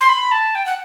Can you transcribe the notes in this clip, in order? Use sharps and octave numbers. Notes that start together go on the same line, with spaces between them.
C6
B5
A5
G5
F#5